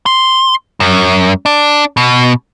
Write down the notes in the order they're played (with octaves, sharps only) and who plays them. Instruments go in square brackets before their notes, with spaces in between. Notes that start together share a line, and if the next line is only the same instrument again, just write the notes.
[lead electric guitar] C6
F#2
D4
B2